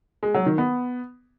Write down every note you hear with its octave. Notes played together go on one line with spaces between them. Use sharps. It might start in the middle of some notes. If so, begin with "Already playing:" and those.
G#3
F#3
D#3
B3